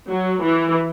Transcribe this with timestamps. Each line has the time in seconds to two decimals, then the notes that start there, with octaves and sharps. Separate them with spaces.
0.11 F#3
0.43 E3